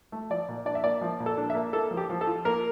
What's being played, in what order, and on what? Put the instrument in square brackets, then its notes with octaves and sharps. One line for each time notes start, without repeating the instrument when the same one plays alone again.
[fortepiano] A3
F3 D5
A#2
D4 D5
E5
A#3 D5
F3
A#2
A4
D4
E5
A#3
A#3 A4
F3
G4
F3
A4
F4
A#3 A#4